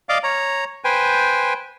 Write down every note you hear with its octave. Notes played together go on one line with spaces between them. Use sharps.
D5 D#5 F5 D6
C#5 A#5
B4 C5 G5 G#5